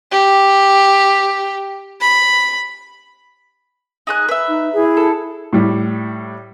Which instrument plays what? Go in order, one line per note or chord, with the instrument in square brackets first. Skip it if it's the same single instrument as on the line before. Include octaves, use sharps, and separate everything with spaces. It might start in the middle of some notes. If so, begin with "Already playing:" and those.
[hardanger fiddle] G4
B5
[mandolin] D#4 G#4 F#6
B4 E5
[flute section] D#4
E4 G#4
[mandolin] A4
[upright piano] A2 G3